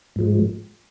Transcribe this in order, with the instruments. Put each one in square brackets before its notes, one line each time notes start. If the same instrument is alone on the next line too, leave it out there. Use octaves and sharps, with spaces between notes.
[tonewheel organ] G#2 F3 G#3